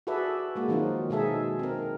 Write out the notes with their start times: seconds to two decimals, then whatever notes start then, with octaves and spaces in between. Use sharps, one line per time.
0.07 F#4 G#4 A4 B4 D5 E5
0.55 G#3 A#3 F#4
0.68 D#3 F3 F#3 C4 D#4 F4
1.10 B2 G#3 D#4 G#4 A4 E5
1.59 C4 A#4